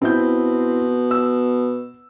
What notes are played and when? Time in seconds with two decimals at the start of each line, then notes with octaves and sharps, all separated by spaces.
0.02 B2 C4 E4 G6
1.11 E6